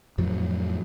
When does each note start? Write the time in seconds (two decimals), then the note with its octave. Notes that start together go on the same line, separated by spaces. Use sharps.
0.18 F2 A2 F3 F#3